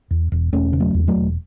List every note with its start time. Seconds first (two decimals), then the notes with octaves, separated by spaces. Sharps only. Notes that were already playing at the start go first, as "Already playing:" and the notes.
0.11 E2
0.32 E1
0.53 E1 A3 C#4
0.73 C#3
0.80 F#3 A3
0.94 E2
1.08 F#3 A3
1.15 E1